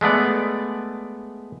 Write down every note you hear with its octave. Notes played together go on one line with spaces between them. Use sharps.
G#3 A3 B3 D5